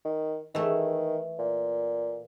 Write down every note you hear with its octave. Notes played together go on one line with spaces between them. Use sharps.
D#3
D#3 E3 A3
A#2